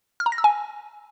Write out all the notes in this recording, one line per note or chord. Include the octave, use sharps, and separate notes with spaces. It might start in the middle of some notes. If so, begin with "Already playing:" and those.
F6
A#5
A#6
E6
G#5